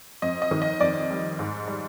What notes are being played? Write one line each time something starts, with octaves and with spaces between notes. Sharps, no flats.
F2 D#5
D#5
D#3
D#5
F2 D5
G3
G#2
G3